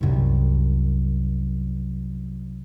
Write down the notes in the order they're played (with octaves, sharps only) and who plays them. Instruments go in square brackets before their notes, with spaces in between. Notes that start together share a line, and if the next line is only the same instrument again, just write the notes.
[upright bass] C2 F#2